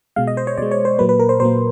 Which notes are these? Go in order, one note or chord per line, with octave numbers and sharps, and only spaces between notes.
B2 G#3 F5
D#5
C5
C#5
B2 G#3 D5
C#5
C5
A#2 F#3 A#3 B4
B4
A#4
C5
A#2 F#3 A#3 C5